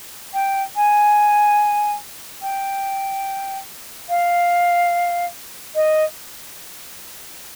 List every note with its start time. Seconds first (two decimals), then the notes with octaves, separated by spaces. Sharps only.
0.33 G5
0.75 G#5
2.41 G5
4.09 F5
5.75 D#5